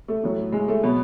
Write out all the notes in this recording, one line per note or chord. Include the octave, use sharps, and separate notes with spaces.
A3
A2 F#3
G#3
A3
B2 F#3 B3